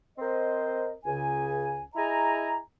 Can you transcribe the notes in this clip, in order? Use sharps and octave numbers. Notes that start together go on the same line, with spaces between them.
C4 A#4 C5 D#5
C#2 C#3 G#5
E4 G#4 D#5 G#5 A#5